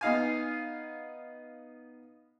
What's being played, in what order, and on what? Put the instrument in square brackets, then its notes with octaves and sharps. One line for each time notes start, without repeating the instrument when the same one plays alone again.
[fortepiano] B3 D#4 F5 G#5